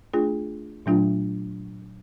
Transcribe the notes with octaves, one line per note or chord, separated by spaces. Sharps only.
A3 D4 F4 G#4
A#2 F#3 A3 D4 F4